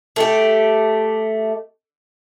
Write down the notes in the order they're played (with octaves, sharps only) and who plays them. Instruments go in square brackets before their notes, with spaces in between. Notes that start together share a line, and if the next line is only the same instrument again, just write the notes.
[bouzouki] A3 G4